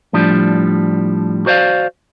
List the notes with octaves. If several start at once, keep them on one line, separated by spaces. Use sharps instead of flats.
A2 F3 G3 D4
F#4 C5 D5 E5 F5